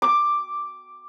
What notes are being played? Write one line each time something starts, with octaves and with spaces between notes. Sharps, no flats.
D6